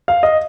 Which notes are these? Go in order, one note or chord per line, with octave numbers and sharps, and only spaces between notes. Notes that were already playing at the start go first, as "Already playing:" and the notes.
F5
D#5